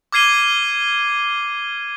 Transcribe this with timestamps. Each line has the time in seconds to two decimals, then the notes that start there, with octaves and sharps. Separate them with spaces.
0.12 D6 F6 G#6 C7 D#7 G7